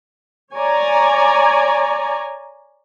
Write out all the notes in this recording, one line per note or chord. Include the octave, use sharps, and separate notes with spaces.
C#5 D5 G#5 A#5